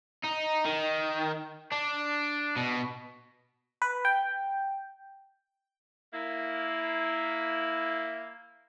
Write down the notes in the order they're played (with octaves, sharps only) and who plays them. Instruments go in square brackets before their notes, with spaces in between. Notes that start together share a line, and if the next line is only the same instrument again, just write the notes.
[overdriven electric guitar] D#4
D#3
D4
B2
[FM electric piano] B4
G5
[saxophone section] A#3 E4